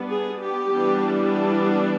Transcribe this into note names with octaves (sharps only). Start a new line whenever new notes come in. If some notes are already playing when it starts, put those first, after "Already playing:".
Already playing: G3 B3 D4
G#4
G4
E3 G3 B3 D4